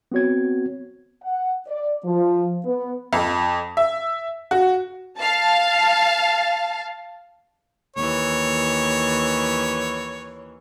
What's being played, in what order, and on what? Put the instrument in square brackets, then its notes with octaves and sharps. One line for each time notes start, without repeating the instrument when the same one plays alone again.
[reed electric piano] B3 C4 F#4 C#5 G#6
[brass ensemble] F#5
D5
F3
B3
[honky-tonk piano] F2
E5
F#4
[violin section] F5 A5
[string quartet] D#2 E3 [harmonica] C#5